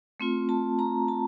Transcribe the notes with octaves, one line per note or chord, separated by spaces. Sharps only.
A3 C4 F4
A5
A#5
A5